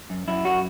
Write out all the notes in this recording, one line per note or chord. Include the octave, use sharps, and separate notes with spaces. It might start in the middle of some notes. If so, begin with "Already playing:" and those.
F#2
F#2 E4
F#3 F#4